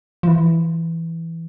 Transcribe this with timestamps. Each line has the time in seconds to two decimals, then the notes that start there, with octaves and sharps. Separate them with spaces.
0.23 F3
0.28 E3